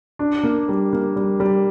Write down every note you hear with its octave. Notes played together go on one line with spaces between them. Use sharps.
D4
A#3
G3
A#3
G3
G3